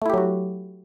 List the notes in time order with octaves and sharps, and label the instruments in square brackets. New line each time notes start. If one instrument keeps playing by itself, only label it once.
[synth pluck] A3
E4
G4
F#3
F#4